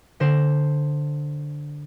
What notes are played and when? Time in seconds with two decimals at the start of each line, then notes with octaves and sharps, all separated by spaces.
0.20 D3 C5 A#6 E7